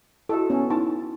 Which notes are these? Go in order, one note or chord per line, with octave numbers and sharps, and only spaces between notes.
E4 F#4 A4 D#5 E5
B3 C#4
D#4 E4 A5